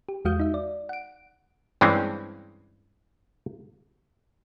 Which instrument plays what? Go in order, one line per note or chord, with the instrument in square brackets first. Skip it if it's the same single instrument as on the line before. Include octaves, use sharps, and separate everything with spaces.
[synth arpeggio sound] G4
E2 G#3 F#4 F5 D#6 G6
D#4 E5
D5
F#5 D7
[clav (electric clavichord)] G2 E3 G#3 C4 C#4